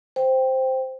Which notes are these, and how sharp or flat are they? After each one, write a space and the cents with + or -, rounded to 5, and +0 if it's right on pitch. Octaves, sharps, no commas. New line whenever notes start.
C5 +0 G5 +0